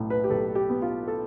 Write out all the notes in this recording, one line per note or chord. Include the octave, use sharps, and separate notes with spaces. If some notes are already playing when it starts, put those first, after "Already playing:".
Already playing: B1 A2
B4
G4
B1 A4
G4
B3
F4
A4